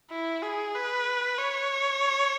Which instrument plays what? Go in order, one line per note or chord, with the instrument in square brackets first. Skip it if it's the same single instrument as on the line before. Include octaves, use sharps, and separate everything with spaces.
[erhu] E4
G#4
B4
C#5